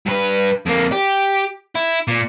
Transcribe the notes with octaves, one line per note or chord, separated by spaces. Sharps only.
G2 B4
F2 A#3
G4
E4
A#2